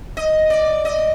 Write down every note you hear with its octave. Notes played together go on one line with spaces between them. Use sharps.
D#5
D5
D#5